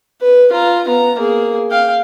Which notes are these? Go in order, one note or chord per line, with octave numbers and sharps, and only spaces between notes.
B4
F4 A#5
B3 A#5
A#3 G#4
F5 G5